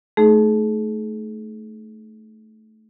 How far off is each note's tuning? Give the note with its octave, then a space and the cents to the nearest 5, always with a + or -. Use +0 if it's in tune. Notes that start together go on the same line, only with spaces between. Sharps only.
A3 -10 D#4 +0 G#4 +35